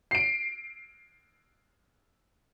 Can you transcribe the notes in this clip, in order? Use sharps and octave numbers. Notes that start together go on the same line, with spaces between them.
C7 D7